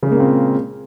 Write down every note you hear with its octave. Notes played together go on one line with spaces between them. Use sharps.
A#2 C#3 G#3 A#3 C4